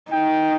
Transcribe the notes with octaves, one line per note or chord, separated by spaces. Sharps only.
D#4 G5